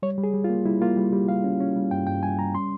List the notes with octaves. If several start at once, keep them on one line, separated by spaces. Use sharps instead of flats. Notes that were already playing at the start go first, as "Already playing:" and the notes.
G3 C#5
G3
G#4
G3
F4
A#3
G3 E4
A#3 F4
G3
G3 G4
G3 F5
C#4
C#4
G3
G2 G5
G2 G5
G3 G#5
G3 A#5
C#4 C6